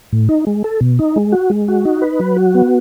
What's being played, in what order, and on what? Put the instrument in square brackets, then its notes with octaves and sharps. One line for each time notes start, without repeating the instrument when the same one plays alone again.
[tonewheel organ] A2
D#4
G#3
A4
B2
D#4
G#3
F#4
G#3
F#4
D#4
B4
F#3
F#4
B3